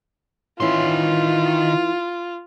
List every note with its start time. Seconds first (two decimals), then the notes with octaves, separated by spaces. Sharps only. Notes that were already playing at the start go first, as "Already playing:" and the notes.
0.60 D#3 E3 C#4 E4 F4 C6